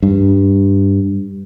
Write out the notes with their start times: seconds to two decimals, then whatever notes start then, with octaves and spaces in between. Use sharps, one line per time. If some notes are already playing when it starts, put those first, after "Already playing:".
0.02 G2